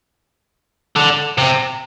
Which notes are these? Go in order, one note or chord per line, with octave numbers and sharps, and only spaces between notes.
D3
C3